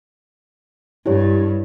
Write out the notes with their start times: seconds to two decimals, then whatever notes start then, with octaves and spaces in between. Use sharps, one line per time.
1.06 G2 E4 G4 C#5